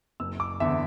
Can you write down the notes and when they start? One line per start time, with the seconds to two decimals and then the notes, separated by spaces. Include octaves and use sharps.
0.20 F#1 E6
0.40 D6
0.60 E2 D3 E5